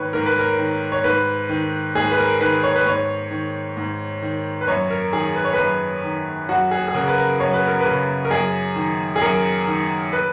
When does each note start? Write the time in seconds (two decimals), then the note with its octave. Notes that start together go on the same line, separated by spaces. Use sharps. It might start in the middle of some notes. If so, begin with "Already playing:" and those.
Already playing: G#2 D#3 B4 C#5
0.13 G#2 A#4
0.26 B4
0.39 A#4
0.59 D#3
0.92 C#5
1.04 G#2 B4
1.49 D#3
1.95 G#2 G#4
2.12 B4
2.18 A#4
2.41 D#3 B4
2.63 C#5
2.76 B4
2.86 G#2 C#5
3.31 D#3
3.77 G#2
4.22 D#3
4.61 B4
4.68 F#2 C#5
4.90 A#4
5.13 D#3 G#4
5.35 B4
5.45 C#5
5.53 B4
5.59 F#2
6.04 D#3
6.49 F#2 F#4
6.71 G#4
6.88 G#4
6.94 C#3 A#4
7.08 B4
7.18 A#4
7.40 F#2 C#5
7.53 B4
7.67 A#4
7.80 C#3 B4
8.25 A#4
8.31 F#2 G#4
8.76 D#3
9.16 G#4
9.21 F#2 A#4
9.67 D#3
10.13 B4